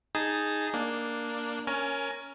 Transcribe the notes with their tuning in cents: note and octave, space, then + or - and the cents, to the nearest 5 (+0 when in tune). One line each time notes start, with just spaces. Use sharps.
D#4 +0 G#4 -5 A5 +0
A#3 +0 D4 +0
C#4 +0 A#4 +0 G#5 +25